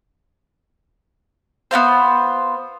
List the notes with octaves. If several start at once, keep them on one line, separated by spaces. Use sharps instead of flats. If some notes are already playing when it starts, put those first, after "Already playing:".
B3 D#4 F4 C5